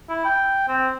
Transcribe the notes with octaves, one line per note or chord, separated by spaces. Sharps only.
E4
G5
C4